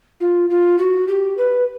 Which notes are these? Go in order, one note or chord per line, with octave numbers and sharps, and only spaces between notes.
F4
F4
F#4
G4
B4